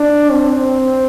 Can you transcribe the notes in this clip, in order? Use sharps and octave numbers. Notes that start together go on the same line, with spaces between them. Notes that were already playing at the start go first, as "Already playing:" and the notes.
Already playing: D4
C4